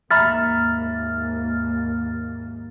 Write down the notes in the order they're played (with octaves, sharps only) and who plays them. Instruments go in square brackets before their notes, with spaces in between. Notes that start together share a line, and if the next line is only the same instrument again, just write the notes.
[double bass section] D#2 G#2 A#3 [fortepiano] E5 A#5 B5 [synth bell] F6 A6